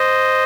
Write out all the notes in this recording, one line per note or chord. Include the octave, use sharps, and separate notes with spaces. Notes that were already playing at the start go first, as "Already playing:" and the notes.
Already playing: C5 D#5